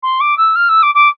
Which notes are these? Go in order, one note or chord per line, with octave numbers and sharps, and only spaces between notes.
C6
D6
E6
F6
E6
D6
D6